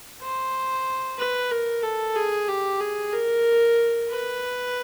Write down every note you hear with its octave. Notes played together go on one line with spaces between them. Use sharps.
C5
B4
A#4
A4
G#4
G4
G#4
A#4
B4